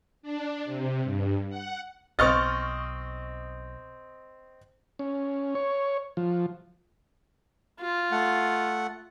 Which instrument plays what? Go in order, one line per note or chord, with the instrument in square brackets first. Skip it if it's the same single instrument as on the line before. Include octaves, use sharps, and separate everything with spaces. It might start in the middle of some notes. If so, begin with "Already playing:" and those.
[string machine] D4
C3
G2
F#5
[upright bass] B1 [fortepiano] C4 D#5 [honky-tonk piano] C#6 F6 A6
[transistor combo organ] C#4
C#5
F3
[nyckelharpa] F4
[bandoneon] A3 F#5